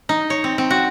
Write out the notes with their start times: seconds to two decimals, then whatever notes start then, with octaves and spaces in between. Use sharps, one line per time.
0.09 D#4
0.30 C#5
0.44 C4
0.58 C4
0.70 F#4